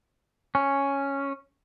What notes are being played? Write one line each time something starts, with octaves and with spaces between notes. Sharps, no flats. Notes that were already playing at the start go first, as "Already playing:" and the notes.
C#4